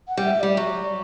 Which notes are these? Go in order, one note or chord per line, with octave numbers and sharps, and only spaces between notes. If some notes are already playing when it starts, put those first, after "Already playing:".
F#5
G3
E5
G3 D5
F#3